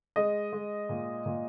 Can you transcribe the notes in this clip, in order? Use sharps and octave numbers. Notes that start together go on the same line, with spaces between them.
G#3 D#5
G#3
A#2
A#2